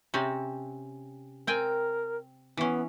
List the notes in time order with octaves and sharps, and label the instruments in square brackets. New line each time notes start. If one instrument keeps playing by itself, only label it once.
[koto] C3 C4 C#4
[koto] C4 G5 G#5 [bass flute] A#4
[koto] E3 C#4 [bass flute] B3